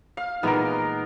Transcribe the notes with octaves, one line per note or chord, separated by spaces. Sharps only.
F5
A#2 E3 G#3 B3 D#4 A#4